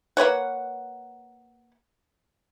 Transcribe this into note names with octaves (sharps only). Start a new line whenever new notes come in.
A#3 B4 C#5 F#5